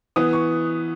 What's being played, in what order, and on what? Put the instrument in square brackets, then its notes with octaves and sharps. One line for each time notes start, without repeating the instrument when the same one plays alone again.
[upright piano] E3 B3 D#6
C#6